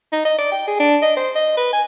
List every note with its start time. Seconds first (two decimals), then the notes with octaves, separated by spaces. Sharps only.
0.12 D#4
0.25 D#5
0.39 D5
0.52 G5
0.67 G#4
0.80 D4
1.02 D#5
1.17 C5
1.35 D#5
1.57 B4
1.73 G#5